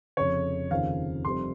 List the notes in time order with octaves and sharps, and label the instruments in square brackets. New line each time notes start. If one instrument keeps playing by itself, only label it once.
[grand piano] F1 F2 C#3 C#5
F1 D#2 C#3 F3 C4 F5
F1 F2 C3 G3 C4 C6